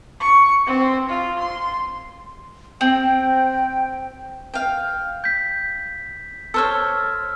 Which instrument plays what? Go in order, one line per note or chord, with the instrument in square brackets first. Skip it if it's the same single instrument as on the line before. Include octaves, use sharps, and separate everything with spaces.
[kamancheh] C#6
C4
F4
C6
[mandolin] C4 [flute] G5
[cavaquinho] F5 G5
[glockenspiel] G6 B6
[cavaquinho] A4 C5 C#5 [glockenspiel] E6 F6